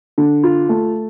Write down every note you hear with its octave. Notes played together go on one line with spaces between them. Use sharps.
D3
F4
A3